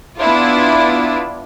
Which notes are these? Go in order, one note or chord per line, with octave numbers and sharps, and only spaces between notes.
B3 D4 E4 F4